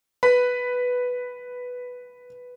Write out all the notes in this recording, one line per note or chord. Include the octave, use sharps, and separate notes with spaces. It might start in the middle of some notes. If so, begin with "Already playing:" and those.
B4 B5